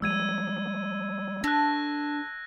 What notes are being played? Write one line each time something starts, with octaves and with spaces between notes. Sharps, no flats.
F3 G3 G#3 E6 G#6 D#7
A3 D4 F#6 A#6